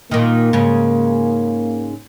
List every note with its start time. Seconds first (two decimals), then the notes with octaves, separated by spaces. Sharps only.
0.11 A#2 D#3 A#3
0.53 G#2 C#3